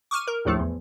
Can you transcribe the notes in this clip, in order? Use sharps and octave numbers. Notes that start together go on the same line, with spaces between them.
C#6 D6 F6 D#7
A#4
A#1 D#2 A2 F3 A3
E2